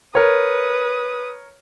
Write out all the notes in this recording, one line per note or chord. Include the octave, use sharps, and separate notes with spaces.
A#4 B4 C#5 D#6